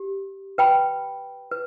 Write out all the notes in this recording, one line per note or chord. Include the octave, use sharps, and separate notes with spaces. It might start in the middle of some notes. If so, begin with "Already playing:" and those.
Already playing: G4
B4 G5 B5
B4